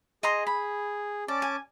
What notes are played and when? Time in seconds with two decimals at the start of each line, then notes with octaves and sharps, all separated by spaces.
0.23 G#4 D#5 A#5 C6
0.47 B5
1.28 C#4 D5 A5 D6
1.42 G#5